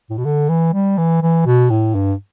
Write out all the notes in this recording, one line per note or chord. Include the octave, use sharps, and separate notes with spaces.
A2
B2
D3
E3
G3
E3
E3
B2
A2
G2